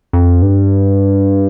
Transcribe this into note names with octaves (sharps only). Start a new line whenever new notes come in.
F2
G2